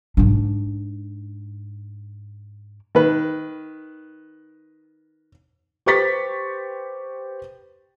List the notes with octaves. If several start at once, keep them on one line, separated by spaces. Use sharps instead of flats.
G#2 D4
D#3 B4
G4 B4 C5 C#6 A6 B6